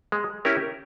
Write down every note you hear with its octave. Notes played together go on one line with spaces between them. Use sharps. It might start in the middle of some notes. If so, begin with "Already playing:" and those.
G#3
C#4 E4 G4 A#4